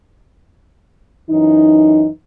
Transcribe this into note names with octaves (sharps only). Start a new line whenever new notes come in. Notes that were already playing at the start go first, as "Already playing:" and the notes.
F#2 E3 D#4